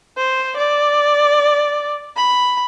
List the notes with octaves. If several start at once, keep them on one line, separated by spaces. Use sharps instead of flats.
C5
D5
B5